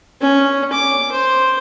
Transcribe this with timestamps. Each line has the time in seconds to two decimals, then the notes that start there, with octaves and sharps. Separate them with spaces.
0.21 C#4
0.73 D6
1.12 C5